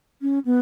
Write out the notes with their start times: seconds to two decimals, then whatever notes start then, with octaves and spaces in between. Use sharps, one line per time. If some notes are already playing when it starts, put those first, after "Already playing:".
0.22 C#4
0.45 B3